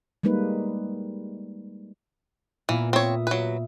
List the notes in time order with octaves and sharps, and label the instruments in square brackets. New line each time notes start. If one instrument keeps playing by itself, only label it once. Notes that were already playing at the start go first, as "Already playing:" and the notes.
[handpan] G3 G#3 A#3 D#4 B4
[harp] A#2 A#3 B3 [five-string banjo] E3
[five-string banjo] C4 C#5 [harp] E5 D#6
[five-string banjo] F#3 B4